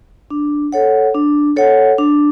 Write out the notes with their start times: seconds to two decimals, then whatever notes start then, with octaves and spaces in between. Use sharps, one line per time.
0.30 D4
0.73 A4 C#5 F#5
1.15 D4
1.56 A4 C#5 F#5
1.98 D4